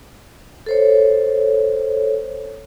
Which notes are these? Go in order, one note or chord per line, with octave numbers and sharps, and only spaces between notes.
A4 C5 C#5